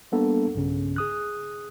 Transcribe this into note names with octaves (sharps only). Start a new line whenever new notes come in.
G3 A#3 B3 D4 A4
B1 G2 C#3 C#4
G#4 D#6 F#6